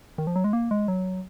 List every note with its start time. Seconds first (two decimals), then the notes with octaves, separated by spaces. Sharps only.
0.18 D#3
0.27 F3
0.36 F#3
0.44 G#3
0.53 A#3
0.71 G#3
0.88 F#3